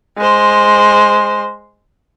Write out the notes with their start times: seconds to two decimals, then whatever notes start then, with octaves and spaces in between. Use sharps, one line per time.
0.18 G#3 C5